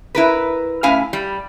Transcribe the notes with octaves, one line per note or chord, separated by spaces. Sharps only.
E4 A#4 B4
A2 C#4 E4 F5 G#5
G3